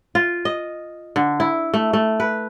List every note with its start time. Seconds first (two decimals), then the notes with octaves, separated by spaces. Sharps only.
0.15 F4
0.45 D#5
1.16 D3
1.40 E4
1.74 A3
1.93 A3
2.20 B4